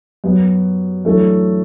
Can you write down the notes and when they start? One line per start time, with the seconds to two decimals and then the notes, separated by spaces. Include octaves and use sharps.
0.24 F#2 F#3 B3
1.05 F#2 E3 A3 D4 A4